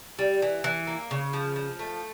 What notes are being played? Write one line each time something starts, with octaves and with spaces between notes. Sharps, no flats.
G3
E3
E3
A#3
C#3
F3
F3
A3